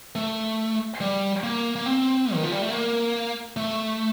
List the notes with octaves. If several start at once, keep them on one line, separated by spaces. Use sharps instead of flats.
A3
G3
A#3
A#3
C4
D#3
F3
G3
A3
A#3
A3